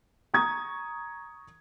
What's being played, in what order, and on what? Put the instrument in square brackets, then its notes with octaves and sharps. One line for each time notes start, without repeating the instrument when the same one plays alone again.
[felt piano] A#5 C#6 D#6 G#6